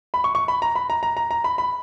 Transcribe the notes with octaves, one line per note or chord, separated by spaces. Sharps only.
B5
C#6
C#6
B5
A#5
B5
A#5
A#5
A#5
A#5
B5
B5